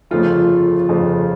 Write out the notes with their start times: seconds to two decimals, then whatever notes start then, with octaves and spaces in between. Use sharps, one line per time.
0.11 G1 F2 C#3 F3 A3 F4
0.89 G1 F2 C#3 F3 A3